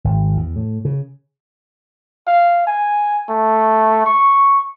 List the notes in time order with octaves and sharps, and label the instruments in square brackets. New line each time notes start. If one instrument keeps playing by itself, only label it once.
[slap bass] G#1
E2
A2
C#3
[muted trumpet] F5
G#5
A3
C#6